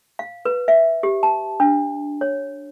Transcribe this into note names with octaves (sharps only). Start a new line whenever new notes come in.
F5
B4
E5
G4
A5
D4
C#5